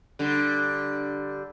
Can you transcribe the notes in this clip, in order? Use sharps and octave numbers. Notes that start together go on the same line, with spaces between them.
D3 G3